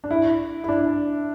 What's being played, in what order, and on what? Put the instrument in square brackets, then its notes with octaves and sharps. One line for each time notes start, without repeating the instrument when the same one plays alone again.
[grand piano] D4
E4
E4
D4